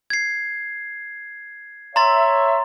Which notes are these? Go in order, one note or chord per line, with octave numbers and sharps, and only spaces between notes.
G#6 C7
C#5 E5 A#5 C6 A6